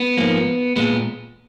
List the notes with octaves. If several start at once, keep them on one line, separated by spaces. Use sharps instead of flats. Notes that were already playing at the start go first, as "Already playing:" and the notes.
Already playing: B3
G#2 F3 A#3
A#2 G#3 B3